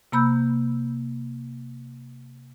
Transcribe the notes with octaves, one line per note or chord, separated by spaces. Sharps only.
C3 A#3 B5 E6 G6